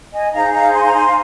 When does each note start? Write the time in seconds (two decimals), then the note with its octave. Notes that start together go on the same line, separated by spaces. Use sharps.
0.13 D#5 G#5
0.33 D#4 G#4 C5 F5 A#5
0.53 F5 A#5
0.73 G#5 C6
0.84 A#5
0.93 G#5 C6
1.07 F5